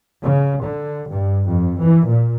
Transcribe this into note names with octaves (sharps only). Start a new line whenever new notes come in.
C#3
D3
G2
F2
E3
A#2